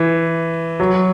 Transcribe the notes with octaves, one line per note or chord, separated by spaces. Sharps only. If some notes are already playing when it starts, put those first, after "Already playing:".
Already playing: E3
F#3